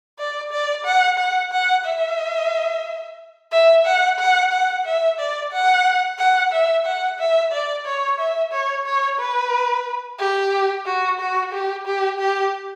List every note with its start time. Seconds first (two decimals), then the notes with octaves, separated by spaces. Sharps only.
0.18 D5
0.51 D5
0.85 F#5
1.18 F#5
1.52 F#5
1.85 E5
3.52 E5
3.85 F#5
4.19 F#5
4.52 F#5
4.85 E5
5.19 D5
5.52 F#5
6.18 F#5
6.52 E5
6.85 F#5
7.19 E5
7.52 D5
7.86 C#5
8.19 E5
8.52 C#5
8.85 C#5
9.19 B4
10.19 G4
10.85 F#4
11.19 F#4
11.52 G4
11.85 G4
12.19 G4